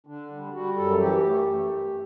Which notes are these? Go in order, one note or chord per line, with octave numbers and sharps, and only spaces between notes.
D3 D4
G3
G3 F#4
F#2 A4
E3 G4
A3
A3
G2